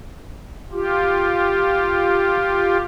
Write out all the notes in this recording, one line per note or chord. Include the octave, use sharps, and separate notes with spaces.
F4 G4